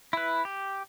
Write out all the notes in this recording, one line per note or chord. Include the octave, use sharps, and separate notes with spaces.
E4 B4
G4